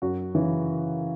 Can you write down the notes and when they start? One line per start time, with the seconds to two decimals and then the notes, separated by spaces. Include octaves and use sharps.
0.02 F#2 F#4
0.35 C#3 E3